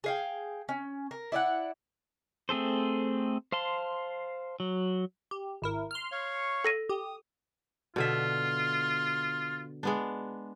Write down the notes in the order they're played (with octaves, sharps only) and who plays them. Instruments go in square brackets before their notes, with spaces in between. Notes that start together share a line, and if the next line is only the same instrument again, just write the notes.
[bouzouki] G#4 F5 G5
C#4
A#4
E4 D5 D#5 F#5
[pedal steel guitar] A3 C4 G#4 A4 C5
C5 F5 A5 C6
F#3
[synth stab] G4
G#1 E4 A#4
C6 F6
[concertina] C#5 F5 C#6
[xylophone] A4 A#6 D#7
[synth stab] G4 [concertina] D#6
[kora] B2 D3 E5 [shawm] F4
[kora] G#3 B3 D4